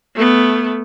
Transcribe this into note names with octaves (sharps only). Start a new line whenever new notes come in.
A3 B3